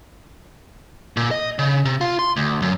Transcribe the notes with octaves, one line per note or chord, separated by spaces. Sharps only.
A#2
D#5
C#3
C3
F4
C6
D2
F#2